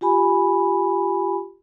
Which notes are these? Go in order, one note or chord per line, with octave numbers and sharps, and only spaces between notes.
F4 G4 G#5 B5